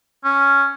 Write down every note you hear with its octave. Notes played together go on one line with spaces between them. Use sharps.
C#4